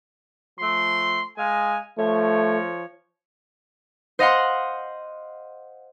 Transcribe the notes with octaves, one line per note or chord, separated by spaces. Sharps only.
F3 A3 C6
G#3 F5 G#5
F3 A3 C#5
C5 D#5 F5 F#5 C6